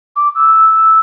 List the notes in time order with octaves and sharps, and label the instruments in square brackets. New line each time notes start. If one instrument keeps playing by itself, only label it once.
[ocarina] D6
E6